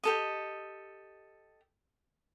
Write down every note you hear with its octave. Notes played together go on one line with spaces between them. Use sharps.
G4 A4 D#5